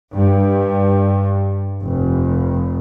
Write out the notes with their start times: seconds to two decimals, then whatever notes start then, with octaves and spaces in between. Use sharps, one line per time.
0.13 G2
1.81 F1